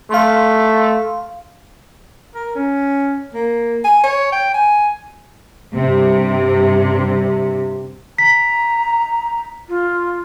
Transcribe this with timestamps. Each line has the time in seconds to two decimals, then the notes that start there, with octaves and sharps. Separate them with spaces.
0.10 A3 F5 C6
2.35 A#4
2.55 C#4
3.34 A#3
3.84 G#5
4.03 C#5
4.32 G5
4.54 G#5
5.76 G2 C3
8.18 A#5 B6
9.69 F4